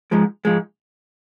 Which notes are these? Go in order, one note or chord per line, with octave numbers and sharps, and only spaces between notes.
G#2 F3 G#3
G#2 F3 G#3